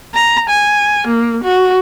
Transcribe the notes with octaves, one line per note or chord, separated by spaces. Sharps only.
A#5
G#5
A#3
F#4